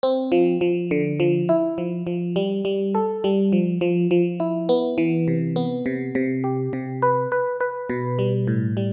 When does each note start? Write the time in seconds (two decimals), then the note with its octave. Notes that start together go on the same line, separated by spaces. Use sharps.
0.03 C4
0.32 F3
0.61 F3
0.91 D3
1.20 F3
1.49 E4
1.78 F3
2.07 F3
2.36 G3
2.65 G3
2.95 A4
3.24 G3
3.52 F3
3.81 F3
4.11 F3
4.40 E4
4.69 B3
4.98 E3
5.28 C3
5.56 B3
5.86 C3
6.15 C3
6.44 G4
6.73 C3
7.02 B4
7.32 B4
7.61 B4
7.90 B2
8.19 G3
8.47 A2
8.77 G3